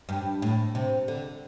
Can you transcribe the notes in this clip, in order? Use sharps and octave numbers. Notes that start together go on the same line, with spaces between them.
G2
A2
C3
D3